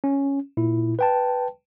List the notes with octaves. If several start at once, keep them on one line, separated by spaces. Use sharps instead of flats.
C#4
A#2 E4
B4 G5 A5